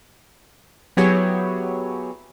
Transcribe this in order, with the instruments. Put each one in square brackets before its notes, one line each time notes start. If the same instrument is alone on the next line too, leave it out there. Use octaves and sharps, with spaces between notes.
[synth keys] F#3 B3 E4 G4 G#4 C#5